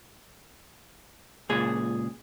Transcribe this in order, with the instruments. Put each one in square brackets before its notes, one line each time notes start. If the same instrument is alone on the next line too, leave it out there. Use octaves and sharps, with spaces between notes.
[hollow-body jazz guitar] C#2 A#2 G#4